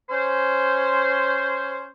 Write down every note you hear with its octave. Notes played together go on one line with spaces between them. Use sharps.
C#4 C5